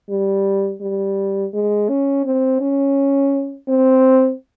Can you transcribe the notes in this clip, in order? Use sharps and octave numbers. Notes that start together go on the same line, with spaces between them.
G3
G3
G#3
C#4
C4
C#4
C4